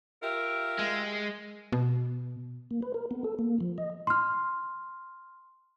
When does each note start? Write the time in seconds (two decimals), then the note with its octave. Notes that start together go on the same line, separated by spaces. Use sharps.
0.23 F4 G4 A#4 E5
0.79 G#3
1.72 B2
2.71 A#3
2.82 B4
2.94 A#4
3.11 B3
3.24 A4
3.39 A#3
3.60 F3
3.78 D#5
4.07 C6 F6